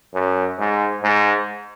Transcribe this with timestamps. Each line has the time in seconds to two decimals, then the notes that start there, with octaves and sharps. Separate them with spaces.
0.14 F#2
0.59 G#2
1.03 G#2